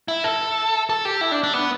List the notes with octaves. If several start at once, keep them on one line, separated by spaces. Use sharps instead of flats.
E4
A4
A4
G4
E4
D4
D4
B3